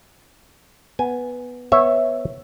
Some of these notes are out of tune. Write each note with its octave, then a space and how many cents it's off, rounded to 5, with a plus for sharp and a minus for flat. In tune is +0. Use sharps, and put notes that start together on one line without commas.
B3 +0 G#5 +0
B3 +0 C#5 -15 E5 +0